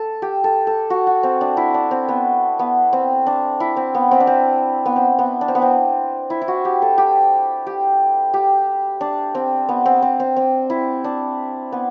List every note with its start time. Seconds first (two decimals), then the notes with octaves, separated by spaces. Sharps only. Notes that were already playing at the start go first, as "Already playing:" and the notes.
Already playing: A4
0.22 G4
0.44 A4
0.67 A4
0.90 F#4
1.07 F#4
1.23 C4
1.41 D4
1.57 E4
1.74 D4
1.91 C4
2.09 B3
2.59 B3
2.93 C4
3.26 D4
3.60 E4
3.77 C4
3.95 B3
4.11 C4
4.20 D4
4.27 C4
4.86 B3
4.96 C4
5.19 B3
5.41 D4
5.48 C4
5.55 B3
5.62 C4
6.30 E4
6.41 E4
6.48 F#4
6.65 G4
6.82 A4
6.98 G4
7.67 G4
8.34 G4
9.01 D4
9.35 C4
9.69 B3
9.86 C4
10.02 C4
10.20 C4
10.37 C4
10.70 E4
11.04 D4
11.72 B3